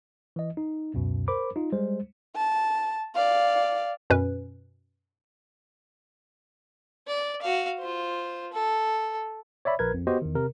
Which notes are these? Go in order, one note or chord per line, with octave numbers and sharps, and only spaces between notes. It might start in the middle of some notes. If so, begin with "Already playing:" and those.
E3 D#5
D#4
C#2 F#2 B2
A#4 C5 B5 D6
D#4 F4
G3 G#3 C5
A5
D5 F5
F#2 B2 C#4 B4
D5
F#4 F5
F4 C5
A4
C#5 D5 E5 B5
A#1 A#4 B4 G#6
F2
B3 F#4 G4 C5 D#5
E2 D#3
C3 A#4